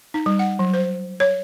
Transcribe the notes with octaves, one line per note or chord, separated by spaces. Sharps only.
D#4
G3
F#5
F#3
C5
C#5